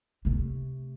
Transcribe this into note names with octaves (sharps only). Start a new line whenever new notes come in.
C3 A3